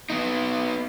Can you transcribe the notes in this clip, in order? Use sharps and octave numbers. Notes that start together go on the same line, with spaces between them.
B3 D#4